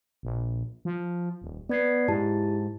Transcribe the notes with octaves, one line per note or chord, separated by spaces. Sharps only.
A#1
F3
D#1
B3 D5 G#6 C7
G#2 E4 G4 A5